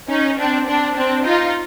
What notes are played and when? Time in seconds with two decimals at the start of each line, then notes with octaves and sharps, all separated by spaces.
0.08 C#4 D#4
0.37 C4 D4
0.67 C4 D4
0.95 C4 D4
1.25 D#4 F4